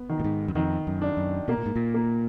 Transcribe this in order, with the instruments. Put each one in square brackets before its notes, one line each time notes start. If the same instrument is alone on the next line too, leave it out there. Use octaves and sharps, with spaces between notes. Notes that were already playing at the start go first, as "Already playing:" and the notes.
Already playing: [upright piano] B3
D#3
[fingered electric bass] A#2
G#2
F#2
[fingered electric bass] F2 [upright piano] D#3
[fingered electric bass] F#2
[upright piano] D4
[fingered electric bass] F#2
[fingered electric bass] B2 [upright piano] A#3
[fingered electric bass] A#2
G#2
A#2
[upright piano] A#3